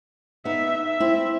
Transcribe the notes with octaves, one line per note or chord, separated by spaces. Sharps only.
B3 D#4 E5
E5
C4 E4